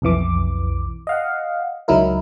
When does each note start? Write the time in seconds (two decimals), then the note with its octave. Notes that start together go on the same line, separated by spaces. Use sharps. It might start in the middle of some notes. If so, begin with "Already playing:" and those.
0.02 B1 F2 E3 D6
1.07 D#5 F5 F#5
1.88 C#2 F#3 D#4 E4 A#4